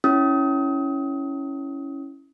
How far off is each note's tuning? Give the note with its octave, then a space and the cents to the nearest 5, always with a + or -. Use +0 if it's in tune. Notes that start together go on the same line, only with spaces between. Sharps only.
C#4 +0 E4 -10 D#6 +30